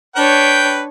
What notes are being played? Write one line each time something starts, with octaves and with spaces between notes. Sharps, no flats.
D4 B4 C#5 G5